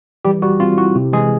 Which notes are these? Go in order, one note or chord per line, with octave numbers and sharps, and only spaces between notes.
E3 G3 G4
G3 F#4
C4 F4
E4 F#4
C3
E3 G#3 G#4